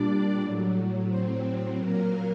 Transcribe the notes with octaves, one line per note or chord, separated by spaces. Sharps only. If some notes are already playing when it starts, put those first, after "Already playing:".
Already playing: A#2 G3 D4 D5
A2 F#3
A2 F#3 C4 C5
A#2 F#3 A#3 A#4